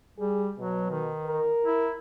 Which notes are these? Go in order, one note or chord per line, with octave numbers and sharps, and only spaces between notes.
G3 G#4
B2 F#3
D#3
A#4
E4